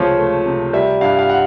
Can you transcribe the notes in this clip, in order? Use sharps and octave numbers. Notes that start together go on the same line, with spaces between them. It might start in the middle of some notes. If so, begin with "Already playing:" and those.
Already playing: C#2 C3 F3 A3 C5 C#5
A3
C3
G3 E5
G2 F5
F5
F#5